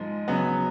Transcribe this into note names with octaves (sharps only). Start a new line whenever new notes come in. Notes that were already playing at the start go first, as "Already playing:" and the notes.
Already playing: G#2 F3 G#3
C#3 F#3 B3